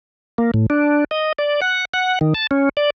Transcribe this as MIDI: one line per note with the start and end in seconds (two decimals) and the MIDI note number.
0.38 0.51 58
0.54 0.66 45
0.70 1.04 62
1.11 1.32 75
1.38 1.60 74
1.61 1.85 78
1.94 2.19 78
2.21 2.34 51
2.35 2.47 81
2.51 2.69 61
2.77 2.90 74